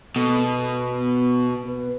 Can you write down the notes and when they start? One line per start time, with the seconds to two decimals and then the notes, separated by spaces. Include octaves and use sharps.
0.16 B2 A4
0.42 B3
1.66 B4